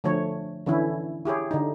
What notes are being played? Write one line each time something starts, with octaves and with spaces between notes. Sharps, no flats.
D3 F3 A3 C#5
D3 E3 C#4 E4
E4 G4 G#4 C#5
D3 D#4